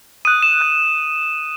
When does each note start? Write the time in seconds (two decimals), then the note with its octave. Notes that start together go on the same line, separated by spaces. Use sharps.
0.25 D#6 F#6 D#7
0.42 E7
0.61 D#6 F#6